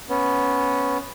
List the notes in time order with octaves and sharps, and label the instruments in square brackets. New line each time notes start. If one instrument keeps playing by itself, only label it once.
[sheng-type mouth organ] B3 C#4